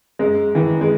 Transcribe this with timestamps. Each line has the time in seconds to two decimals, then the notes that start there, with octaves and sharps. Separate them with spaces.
0.19 F#2 G#3
0.55 D#3 E3
0.81 G#3